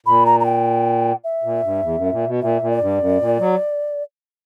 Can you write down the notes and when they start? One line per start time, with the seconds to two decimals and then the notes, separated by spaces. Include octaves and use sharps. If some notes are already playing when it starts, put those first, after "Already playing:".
0.06 A#2 B5
0.26 A#5
0.40 A#5
0.45 G5
1.24 E5
1.44 A#2
1.63 G2
1.83 E2
1.97 F#2
2.12 A#2
2.27 B2
2.41 A#2 E5
2.62 A#2
2.70 D5
2.81 G2
3.00 F#2
3.20 A#2
3.39 F#3